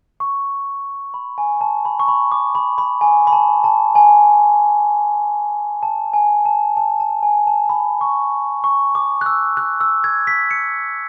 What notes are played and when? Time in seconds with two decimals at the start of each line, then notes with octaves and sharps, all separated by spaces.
0.20 C#6
1.14 B5
1.38 G#5
1.61 A5
1.85 B5
2.00 C#6
2.08 B5
2.32 D6
2.55 B5
2.78 B5
3.01 G#5
3.27 B5
3.33 A5
3.64 A5
3.95 G#5
5.83 A5
6.13 G#5
6.46 A5
6.77 A5
7.00 A5
7.23 G#5
7.47 A5
7.69 B5
8.01 C#6
8.64 C#6
8.95 D6
9.21 F#6
9.26 E6
9.57 F#6
9.81 E6
10.04 G#6
10.27 B6
10.51 C#7